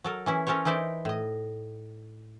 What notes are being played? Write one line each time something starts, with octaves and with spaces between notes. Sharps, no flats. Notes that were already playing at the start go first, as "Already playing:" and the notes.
F#3 A4 A#4
E3 C#4 E4
C#4 A4 A#4 C5 C#5
E3 D#4 E4 C5 D5
A2 D#5